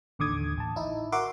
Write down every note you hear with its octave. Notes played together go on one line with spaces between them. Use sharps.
A1 D#2 D3 D6 D#6 G#6
A1 A5
D#4 E4
F#4 A#4 E5 F#5 C6 D6